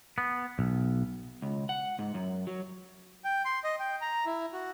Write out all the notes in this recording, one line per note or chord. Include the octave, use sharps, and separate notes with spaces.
B3
B1
C#2
F#5
G#2
F#2
F#3
G5
C6
D#5
G5
A#5
E4
F#4